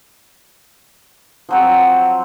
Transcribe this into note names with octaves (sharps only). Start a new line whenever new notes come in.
F3 F#3 C4